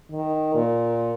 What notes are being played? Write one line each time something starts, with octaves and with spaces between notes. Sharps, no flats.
D#3
A#2